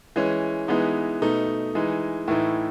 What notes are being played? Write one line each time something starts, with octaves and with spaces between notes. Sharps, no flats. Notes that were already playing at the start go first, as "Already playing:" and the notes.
E3 G#3 C#4
E3 G#3 B3 D#4
B2 A3 D#4
E3 G#3 D#4
A2 E3 A3 D#4